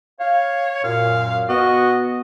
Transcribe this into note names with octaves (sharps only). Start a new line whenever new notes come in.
C#5 F5
F#2 A#2 F5
B3 F#4 D#5